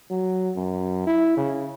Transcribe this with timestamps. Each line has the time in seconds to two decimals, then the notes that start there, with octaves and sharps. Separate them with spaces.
0.10 F#3
0.56 F#2
1.07 E4
1.37 C#3